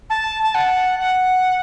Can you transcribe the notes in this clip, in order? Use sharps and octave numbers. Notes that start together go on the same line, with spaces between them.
A5
A5
F#5
F#5